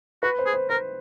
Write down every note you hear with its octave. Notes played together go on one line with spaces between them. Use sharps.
F#4 B4
C5
G#4
C5
A#4 C5